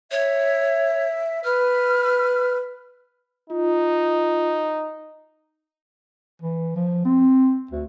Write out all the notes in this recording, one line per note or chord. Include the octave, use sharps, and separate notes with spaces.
C#5 E5
B4 F6
D#4 F4
E3
F3
C4
D2